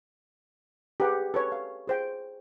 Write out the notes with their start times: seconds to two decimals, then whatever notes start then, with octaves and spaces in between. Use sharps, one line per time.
1.00 G4 G#4 B4 F#5
1.34 A4 B4 C#5
1.52 F5
1.87 G#4 C5 G5